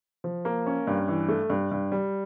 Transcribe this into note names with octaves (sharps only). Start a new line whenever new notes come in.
F3
A#3
C#4
G2
E3
A3
G2
G2
G3